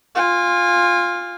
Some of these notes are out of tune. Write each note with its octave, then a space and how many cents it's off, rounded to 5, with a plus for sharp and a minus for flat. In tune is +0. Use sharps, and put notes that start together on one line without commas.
F4 +5 G#5 -30